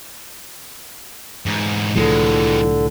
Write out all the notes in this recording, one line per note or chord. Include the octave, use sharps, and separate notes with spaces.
G#2 E3
C2 A2 D3 E3 F3 G#3